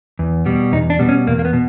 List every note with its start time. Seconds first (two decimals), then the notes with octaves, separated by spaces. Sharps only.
0.19 E2
0.46 B2 G3
0.72 E2 D#4
0.90 D4
0.99 B2 G3
1.09 C#4
1.27 E2 A#3
1.39 A#3
1.45 B3
1.53 B2